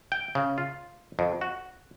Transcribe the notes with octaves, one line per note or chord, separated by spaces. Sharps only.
G5
C#3
F4
F2
F#4